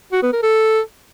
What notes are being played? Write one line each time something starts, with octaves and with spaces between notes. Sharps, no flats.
F#4
B3
A#4
A4